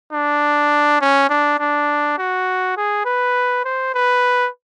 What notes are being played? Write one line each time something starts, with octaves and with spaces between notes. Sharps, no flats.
D4
C#4
D4
D4
F#4
G#4
B4
C5
B4